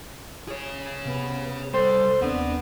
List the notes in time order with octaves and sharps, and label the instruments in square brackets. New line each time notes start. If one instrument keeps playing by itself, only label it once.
[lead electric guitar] G#4 C#5
[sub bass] C3 [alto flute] B3
[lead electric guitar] G3 [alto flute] A4 [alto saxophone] C5
[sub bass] D#2 [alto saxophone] B3 [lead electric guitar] C4 [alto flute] D4